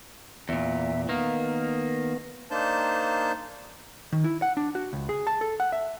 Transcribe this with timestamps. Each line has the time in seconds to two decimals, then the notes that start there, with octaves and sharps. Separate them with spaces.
0.49 E2 A#2 E5
1.09 D#3 A#3 B3
2.51 A#3 D4 D#4 C5 A5 G6
4.12 D#3
4.24 E4
4.42 F#5
4.57 D4
4.75 F#4
4.93 C#2
5.09 G#4
5.27 A5
5.41 A4
5.60 F#5
5.72 E5